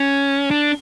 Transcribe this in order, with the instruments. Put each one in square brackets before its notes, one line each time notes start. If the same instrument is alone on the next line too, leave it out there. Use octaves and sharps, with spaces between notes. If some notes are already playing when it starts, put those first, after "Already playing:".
Already playing: [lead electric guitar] C#4
D4